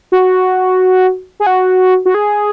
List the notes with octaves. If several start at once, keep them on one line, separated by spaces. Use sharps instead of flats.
F#4
G#4
F#4
F#4
G#4